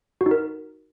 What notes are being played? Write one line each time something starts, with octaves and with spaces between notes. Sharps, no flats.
F#4
D#4
A#4